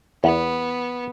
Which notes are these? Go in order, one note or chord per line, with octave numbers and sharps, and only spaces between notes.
E2 B3